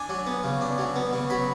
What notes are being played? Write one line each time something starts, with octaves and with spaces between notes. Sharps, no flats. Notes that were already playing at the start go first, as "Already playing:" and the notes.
Already playing: D4 G#5
F#3
B3
C#3
D4
F#3
B3
C#3
F#3 B5